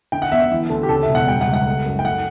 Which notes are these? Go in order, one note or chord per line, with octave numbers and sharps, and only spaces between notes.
D3 G5
F#5
G1 E5
E5
E3
D2 A4
G4
C#3 A4
E5
E1
F#5
G3 G5
F#5
C#2
F#5
A3
F#2
G5
A3 F#5